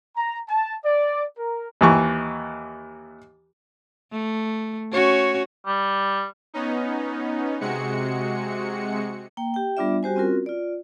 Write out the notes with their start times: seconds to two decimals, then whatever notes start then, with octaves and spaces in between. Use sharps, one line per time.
0.17 A#5
0.49 A5
0.84 D5
1.38 A#4
1.81 D#2 E3 C#6
4.12 A3
4.92 C#4 F#4 C#5
5.67 G3
6.54 B3 C#4 D#4
7.61 C3 G#3 F#4 C#7
9.37 A#3 G5
9.54 G4 G5
9.77 G3 B3 D4 F4 D5 E5
10.03 G3 F#4 G4 C5 G#5
10.16 C4 C#4 F4 F#4 A#4
10.46 F4 D5